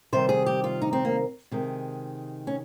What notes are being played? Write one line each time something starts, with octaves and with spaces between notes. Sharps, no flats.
C3 D#3 G3 C5
G#4
G4
F4
D#4
C4
A#3
C3 D#3 G#3
C#4